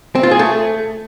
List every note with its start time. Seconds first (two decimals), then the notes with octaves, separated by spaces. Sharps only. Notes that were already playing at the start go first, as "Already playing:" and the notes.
0.15 C4
0.23 F4
0.31 G#4
0.39 A3